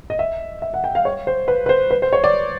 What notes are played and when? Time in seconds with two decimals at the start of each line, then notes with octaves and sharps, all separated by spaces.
0.10 D#5
0.19 E5
0.62 E5
0.74 F#5
0.84 G5
0.95 F5
1.05 C#5
1.27 C5
1.48 B4
1.66 B4
1.69 C5
1.91 B4
2.02 C5
2.13 C#5
2.24 D5